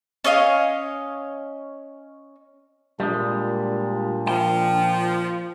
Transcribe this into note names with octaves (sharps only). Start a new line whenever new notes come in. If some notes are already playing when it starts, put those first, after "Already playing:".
C#4 C#5 D#5 F5
A#2 G3 G#3 D4
F3 G5